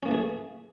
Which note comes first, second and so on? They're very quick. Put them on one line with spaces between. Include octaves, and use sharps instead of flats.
C#4 A#3 E3 A3 G#4